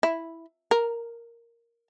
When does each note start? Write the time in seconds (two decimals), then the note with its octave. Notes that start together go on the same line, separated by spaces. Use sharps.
0.03 E4
0.71 A#4